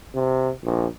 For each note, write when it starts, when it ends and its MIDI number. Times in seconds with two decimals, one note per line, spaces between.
0.15 0.51 48
0.64 0.86 34